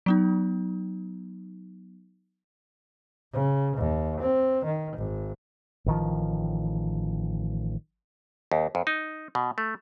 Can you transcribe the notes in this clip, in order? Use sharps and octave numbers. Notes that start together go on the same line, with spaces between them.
F#3 B3 D#4
C#3
D#2
C4
D#3
G#1
A1 D#3 F3
D#2
F2
D#4
B2
A3